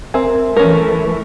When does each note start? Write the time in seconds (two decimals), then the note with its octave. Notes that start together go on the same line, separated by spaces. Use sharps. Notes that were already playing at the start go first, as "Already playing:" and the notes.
0.14 C4 A#4 E5 G#5
0.56 E3 A3 C#4 A#4 C#6